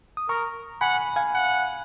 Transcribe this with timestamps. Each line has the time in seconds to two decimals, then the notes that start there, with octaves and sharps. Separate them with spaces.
0.17 D#6
0.29 A#4 A#5 C#6
0.81 F#5 G#5 B5
1.16 F5 G#5
1.34 F#5